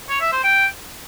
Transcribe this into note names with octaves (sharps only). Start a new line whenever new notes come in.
C#5
E5
C5
G5